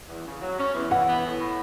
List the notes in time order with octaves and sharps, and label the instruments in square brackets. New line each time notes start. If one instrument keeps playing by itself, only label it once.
[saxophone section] E2
C#3
F#3
C#4
E2
[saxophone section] E3 [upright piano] F#5
[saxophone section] B3
A2
A2